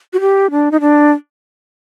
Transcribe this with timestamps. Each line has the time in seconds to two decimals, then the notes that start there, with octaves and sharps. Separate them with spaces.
0.13 F#4
0.21 G4
0.51 D4
0.71 D#4
0.81 D4